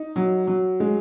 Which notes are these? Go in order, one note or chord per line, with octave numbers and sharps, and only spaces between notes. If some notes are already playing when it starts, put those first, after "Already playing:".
Already playing: D#4
F#3
F#3
G#3